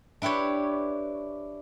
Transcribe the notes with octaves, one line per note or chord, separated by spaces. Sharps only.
D4 E4 G4 B4 C#5